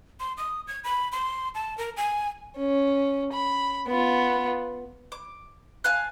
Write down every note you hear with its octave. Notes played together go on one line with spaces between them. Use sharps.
C6
D#6
G#6
B5
C6
A5
A#4
G#5
C#4
B5
B3 F4
D6
F5 G#5 A5 F#6